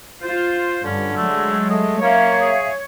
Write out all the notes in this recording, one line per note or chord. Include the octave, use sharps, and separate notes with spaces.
F4 C5
G2 D3 C#4
F#3 G#3 A3
A3 D#5
A#3 C#4 C#5 E5 F5
G#4